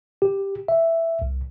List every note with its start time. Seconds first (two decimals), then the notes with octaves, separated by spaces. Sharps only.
0.22 G4
0.68 E5
1.22 C2